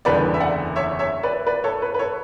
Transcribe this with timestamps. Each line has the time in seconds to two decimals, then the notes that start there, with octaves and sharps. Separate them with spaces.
0.05 F#1 E2 D3 G3 B4 D5
0.34 E5
0.40 D5 F#5
0.76 C#5 E5
0.99 C#5 E5
1.23 B4 D5
1.47 B4 D5
1.64 A4 C#5
1.82 B4
1.94 B4
1.99 A4 C#5